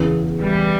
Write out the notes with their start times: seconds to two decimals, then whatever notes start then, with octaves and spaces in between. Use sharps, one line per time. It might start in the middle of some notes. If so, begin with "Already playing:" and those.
Already playing: E2 C#3 E3 B3 E4
0.40 E3 G3